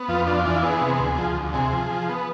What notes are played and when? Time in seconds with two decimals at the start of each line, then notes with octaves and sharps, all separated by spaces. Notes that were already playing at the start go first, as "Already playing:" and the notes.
Already playing: B3
0.08 F2 F4
0.27 D4 F4
0.45 E3 F4
0.63 B3 G#4
0.81 C3
1.00 D2
1.18 F3
1.36 D2
1.54 C3 G#4
1.72 F3
1.90 F3
2.09 B3